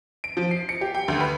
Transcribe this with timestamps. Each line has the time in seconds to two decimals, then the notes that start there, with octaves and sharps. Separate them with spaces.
0.24 D7
0.37 F3
0.51 C7
0.69 C#7
0.81 G4
0.95 G5
1.08 D2
1.20 B4